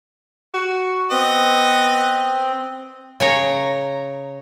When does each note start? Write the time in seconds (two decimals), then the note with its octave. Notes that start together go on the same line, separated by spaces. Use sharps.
0.54 F#4
1.11 B3 C4 D#5
3.20 C#3 C#5 A#5